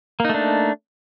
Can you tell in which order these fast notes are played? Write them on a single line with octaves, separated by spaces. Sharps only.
A#3 D#4 A3 D4